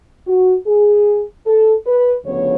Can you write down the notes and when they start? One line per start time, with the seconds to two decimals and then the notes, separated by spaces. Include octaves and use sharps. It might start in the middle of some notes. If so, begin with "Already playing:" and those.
0.27 F#4
0.67 G#4
1.47 A4
1.86 B4
2.26 D2 C#3 F3 B3 C#5